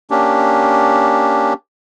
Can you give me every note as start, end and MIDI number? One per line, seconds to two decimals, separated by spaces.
0.11 1.53 58
0.11 1.53 61
0.11 1.53 62
0.11 1.53 67